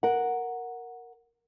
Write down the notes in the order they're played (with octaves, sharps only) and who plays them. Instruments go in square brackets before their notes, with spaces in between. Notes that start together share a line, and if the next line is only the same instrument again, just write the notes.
[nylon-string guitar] A#4 F#5